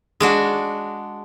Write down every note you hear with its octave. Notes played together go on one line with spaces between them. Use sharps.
G#3 D4 F#4